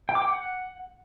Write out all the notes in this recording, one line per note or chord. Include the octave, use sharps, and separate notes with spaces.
G5
D6
G5
F#5